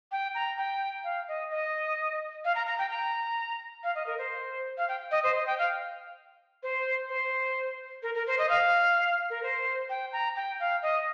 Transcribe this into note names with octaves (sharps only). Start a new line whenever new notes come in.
G5
A#5
G5
F5
D#5
D#5
F5
A#5
A#5
G5
A#5
F5
D#5
A#4
C5
F5
G5
D#5
C5
D#5
G5
F5
C5
C5
A#4
A#4
C5
D#5
F5
A#4
C5
G5
A#5
G5
F5
D#5